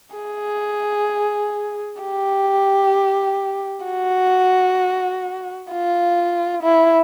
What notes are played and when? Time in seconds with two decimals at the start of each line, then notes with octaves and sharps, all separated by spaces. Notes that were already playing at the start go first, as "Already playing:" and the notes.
0.16 G#4
2.01 G4
3.85 F#4
5.71 F4
6.63 E4